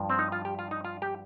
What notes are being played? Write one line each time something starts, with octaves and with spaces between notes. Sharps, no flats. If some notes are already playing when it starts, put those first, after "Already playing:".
Already playing: G2 F3
C4
D#4
F4
G4
F4
D#4
F4
G4